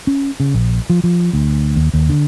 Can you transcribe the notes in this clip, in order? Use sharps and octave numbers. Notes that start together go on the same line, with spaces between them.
C#4
C#3
A#1
F3
F3
D2
D#2
D#2
D3